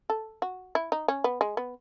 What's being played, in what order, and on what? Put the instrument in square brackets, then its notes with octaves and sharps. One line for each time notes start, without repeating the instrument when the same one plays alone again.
[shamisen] A4
F#4
E4
D#4
C#4
B3
G#3
B3